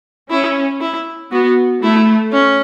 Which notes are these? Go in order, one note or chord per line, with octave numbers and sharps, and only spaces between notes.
C#4 E4
E4
B3 F#4
A3 E4
C#4